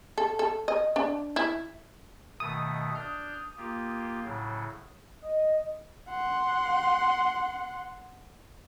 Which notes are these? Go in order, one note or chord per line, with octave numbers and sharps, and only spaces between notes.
A4
A4
D#5
D4
E4
B2 D#3 A3 D#6
D4 F6 G6
A#3 F4 G4
A2 C#3 F#3
D#5
F#5 C6